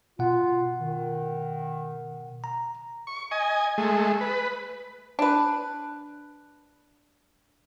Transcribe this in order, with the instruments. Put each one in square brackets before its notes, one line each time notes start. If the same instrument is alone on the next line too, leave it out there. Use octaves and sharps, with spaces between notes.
[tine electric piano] B2 F#5 [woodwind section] F4
[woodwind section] D#3
[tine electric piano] A#5
[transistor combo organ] C#6
D#5 G#5
G#3 A3
B4
[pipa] D4 B4